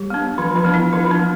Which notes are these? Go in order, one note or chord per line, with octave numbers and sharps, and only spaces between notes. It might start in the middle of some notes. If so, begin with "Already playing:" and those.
Already playing: G3 G4
B3 D4
E3 F3 F4
F3 F4
B3 D4
E4
E3 F3 F4
D4
B3